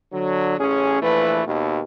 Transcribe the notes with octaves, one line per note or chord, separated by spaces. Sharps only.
D3 F#3
A1 C#4 G#4
A#1 E3 A3 B4
D#2 B2